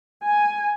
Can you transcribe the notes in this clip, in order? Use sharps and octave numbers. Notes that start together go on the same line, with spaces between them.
G#5